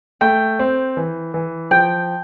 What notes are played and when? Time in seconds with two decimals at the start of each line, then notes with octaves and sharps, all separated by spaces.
0.21 A3 G5
0.59 C4
0.97 E3
1.34 E3
1.71 F3 G5